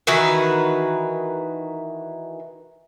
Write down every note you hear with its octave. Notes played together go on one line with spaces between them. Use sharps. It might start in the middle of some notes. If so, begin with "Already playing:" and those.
D#3 E3 F#4 B4